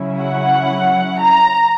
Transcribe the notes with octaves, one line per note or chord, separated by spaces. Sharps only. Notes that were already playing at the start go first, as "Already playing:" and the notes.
Already playing: C#3 F#3 C#4 E4
F#5
A#5